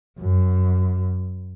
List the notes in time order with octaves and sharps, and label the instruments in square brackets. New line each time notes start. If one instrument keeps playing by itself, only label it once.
[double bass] F#2